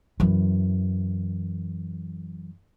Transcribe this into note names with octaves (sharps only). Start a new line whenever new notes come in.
F#2 E3